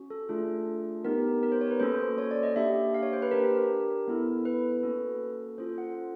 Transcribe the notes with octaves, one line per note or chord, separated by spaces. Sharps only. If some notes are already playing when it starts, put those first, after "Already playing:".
Already playing: C#4 F#4
A4
A3 D4 F4 G#4
B3 D#4 G4 A#4
A#4
C5
C#5
B4
A#3 C#4 F#4 A4 C5
C5
C#5
D5
D#5
A#3 D4 G4 E5
F5
C#5
C5
B4
D4 G4 A#4
A#4
A#4
B3 E4 A4
B4
A#3 C#4 F#4 A4
C#4 F4 A4 C5
F#5